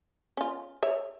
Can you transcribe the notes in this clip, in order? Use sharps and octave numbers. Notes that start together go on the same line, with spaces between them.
C#4 F4
C#5 E5